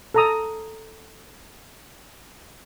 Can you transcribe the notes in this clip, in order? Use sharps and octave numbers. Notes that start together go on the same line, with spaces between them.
A4 A#5 D#6